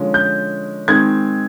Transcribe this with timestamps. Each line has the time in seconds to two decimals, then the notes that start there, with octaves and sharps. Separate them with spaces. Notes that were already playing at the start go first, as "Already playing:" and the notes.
Already playing: D3 F3 G#3 C#4
0.14 G6
0.88 D#3 G#3 C4 G#6